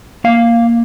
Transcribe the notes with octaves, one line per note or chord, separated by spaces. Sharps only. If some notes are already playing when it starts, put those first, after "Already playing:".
A#3 F5